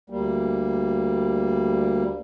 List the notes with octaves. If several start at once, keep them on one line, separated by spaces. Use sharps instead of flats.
D2 G3 A#3